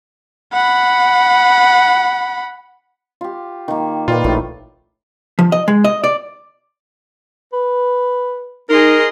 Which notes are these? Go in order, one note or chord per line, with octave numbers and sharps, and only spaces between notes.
F#5 B5
F4 G4
D#3 A#3
A#2 F4 B4 D5 G5
A#1 A2 D#3
F3
D#5
G#3
D#5
D5
B4
D#4 G#4 A#4 D#5 C6